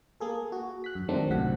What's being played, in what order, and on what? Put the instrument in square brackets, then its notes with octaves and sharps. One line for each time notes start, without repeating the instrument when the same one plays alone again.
[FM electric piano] A#3 G#4 A4
F#4
F#6 B6
F#2
D#3 F#3 G#3 A3 C4 D4
C#2 F#2 A2 C3 F#5 B6